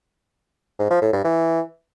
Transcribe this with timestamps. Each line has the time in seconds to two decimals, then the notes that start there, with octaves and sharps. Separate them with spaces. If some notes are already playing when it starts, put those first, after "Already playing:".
0.79 G#2
0.90 F3
1.02 A2
1.13 G2
1.24 E3